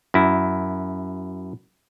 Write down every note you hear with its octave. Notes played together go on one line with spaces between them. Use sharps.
F#2 E4